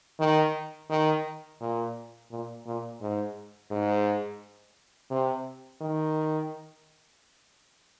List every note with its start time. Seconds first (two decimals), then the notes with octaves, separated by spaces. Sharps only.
0.20 D#3
0.90 D#3
1.61 A#2
2.31 A#2
2.66 A#2
3.01 G#2
3.71 G#2
5.11 C3
5.81 D#3